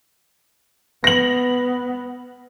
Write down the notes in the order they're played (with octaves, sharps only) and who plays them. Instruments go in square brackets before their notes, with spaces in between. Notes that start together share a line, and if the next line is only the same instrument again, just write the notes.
[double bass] B3 [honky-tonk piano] A#6 F#7